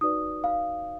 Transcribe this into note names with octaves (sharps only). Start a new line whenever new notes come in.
D#4 F#4 B4 D5 D#6
F5